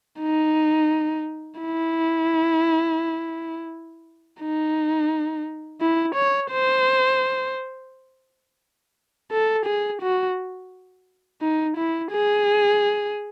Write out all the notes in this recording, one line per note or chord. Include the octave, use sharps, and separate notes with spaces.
D#4
E4
D#4
E4
C#5
C5
A4
G#4
F#4
D#4
E4
G#4